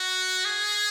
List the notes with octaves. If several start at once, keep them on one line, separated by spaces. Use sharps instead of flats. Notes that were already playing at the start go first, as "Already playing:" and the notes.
Already playing: F#4
G#4